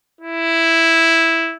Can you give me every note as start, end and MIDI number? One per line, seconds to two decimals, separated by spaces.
0.21 1.56 64